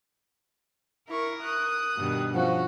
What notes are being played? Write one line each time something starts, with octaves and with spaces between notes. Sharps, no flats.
E4 A#4 C#6
D#6 F#6
G2 B2 D#3
F3 C#4 F#4